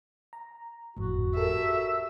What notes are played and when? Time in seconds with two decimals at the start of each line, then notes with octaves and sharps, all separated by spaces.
0.33 A#5
0.97 G1 F2 A2 F#4
1.36 G4 A4 A#4 E5